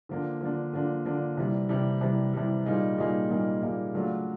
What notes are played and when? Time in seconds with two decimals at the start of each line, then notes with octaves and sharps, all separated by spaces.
0.09 D3 F3 A#3 D4
0.41 D3 F3 A#3 D4
0.73 D3 F3 A#3 D4
1.06 D3 F3 A#3 D4
1.37 C3 E3 G3
1.69 C3 E3 G3
2.01 C3 E3 G3
2.33 C3 E3 G3
2.66 A#2 G3 A#3 D#4 G#4
2.98 A#2 G3 A#3 D#4 G#4
3.30 A#2 G3 A#3 D#4 G#4
3.62 A#2 G3 A#3 D#4 G#4
3.94 C#3 F#3 A3 D4 F4